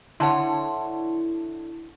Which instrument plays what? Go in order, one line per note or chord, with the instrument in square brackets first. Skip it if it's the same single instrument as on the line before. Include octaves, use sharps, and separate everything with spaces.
[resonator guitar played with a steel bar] D3 C#5 [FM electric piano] E4 [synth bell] F#5 A5 C6